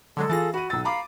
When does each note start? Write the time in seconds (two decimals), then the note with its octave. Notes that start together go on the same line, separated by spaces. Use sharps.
0.17 D3 F#3 G#3 A4
0.30 E3 F4 G#4 A6 A#6
0.54 F#4 B5 D#7
0.70 B1 E6 A6
0.85 F5 A#5 B5 D6